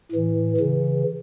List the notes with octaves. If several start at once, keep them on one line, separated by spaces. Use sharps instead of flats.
A2 E3
C#3 E3